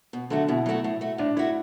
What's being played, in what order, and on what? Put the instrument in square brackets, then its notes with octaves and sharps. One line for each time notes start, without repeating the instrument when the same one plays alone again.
[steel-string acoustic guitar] B2
[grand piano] D3 [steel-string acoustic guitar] F#3 A3 F#4
[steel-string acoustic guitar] B2 [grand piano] E4
[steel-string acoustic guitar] F#3 A3 F#4
A2
A3 F#4
[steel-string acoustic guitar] A2 [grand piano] D4
[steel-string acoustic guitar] A3 F#4 [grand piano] E4